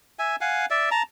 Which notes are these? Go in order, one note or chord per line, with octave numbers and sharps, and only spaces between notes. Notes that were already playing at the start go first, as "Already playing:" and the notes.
E5 G#5
F5 F#5 G#5
D5 E5
A5 A#5